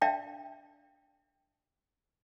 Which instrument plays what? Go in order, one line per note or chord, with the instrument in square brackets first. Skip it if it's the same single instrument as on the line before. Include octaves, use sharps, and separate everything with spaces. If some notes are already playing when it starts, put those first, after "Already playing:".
[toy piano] D4 D5 E5 F5 G5 A5